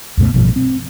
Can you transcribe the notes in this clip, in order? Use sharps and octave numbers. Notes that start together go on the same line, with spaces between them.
C#2 F#2 B2 A3
A1 G2 B2 F3
C4